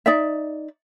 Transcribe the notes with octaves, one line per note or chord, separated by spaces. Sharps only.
D#4 D5 E5